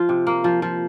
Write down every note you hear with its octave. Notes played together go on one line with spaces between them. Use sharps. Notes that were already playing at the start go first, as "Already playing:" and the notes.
Already playing: F3 F4
C3
A#3
F3
F3